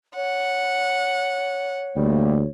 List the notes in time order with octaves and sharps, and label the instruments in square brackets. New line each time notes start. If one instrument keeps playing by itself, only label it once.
[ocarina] C#5 [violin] F#5
[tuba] D2 [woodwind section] G3 A3 A#3